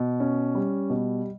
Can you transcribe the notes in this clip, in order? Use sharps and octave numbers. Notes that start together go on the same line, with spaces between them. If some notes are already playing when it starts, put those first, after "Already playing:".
Already playing: B2
C#4
G3
B2